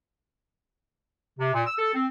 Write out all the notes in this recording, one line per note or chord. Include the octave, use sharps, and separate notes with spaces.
C3
A#2
E6
A4
C4